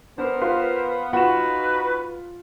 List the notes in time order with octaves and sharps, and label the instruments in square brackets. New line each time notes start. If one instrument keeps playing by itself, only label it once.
[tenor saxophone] B3 [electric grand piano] D4 [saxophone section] A#4 C5
[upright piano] F4 [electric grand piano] B4 F5 C6
[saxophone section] D#4 F#4 [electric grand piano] F4 E7 [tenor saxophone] B4 [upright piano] F#5